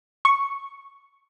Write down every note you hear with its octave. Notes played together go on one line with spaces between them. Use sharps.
C#6